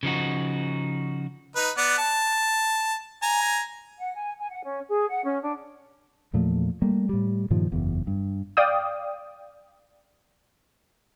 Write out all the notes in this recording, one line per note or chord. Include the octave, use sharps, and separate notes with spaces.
C#3 F3 D#4 F#4
D#4 B4
B3 D5 F#5
A5
G#5 A#5
F#5
G#5
G#5
F#5
C#4
G#4
F#5
C#4
D4
E2 A#2 F3 A3
G3 A3 A#3
A2 G3
G2 A#2 D#3 F3
F#1 E2
G2
D5 F5 G5 D#6